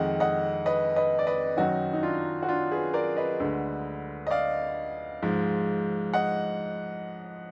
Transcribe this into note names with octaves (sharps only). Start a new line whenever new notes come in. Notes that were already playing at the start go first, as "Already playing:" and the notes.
Already playing: F2 D#3 G#3 D#5 F#5
D#5 F#5
B4 D#5
B4 D#5
D5
B4 D#5
F#2 D#3 F#3 D#4 F#4
D#4
D4 F4
F#4
D4 F4
G#4 B4
A#4 D5
B4 D#5
D2 D3 G#3
D#5
D5 F5
G#2 F3 G#3
D#5 F#5